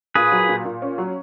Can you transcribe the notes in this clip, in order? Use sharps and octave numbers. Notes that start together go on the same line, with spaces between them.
A#2 G#4 B4
F#3
A#2
A#2
C#4
F#3